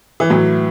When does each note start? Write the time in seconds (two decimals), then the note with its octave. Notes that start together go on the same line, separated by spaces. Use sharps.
0.20 E3
0.30 A2 E3 F#3